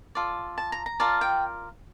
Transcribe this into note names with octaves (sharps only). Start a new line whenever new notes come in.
F4 A4 D5
A5
A#5
A#5
F4 A#4 D5 A5
G5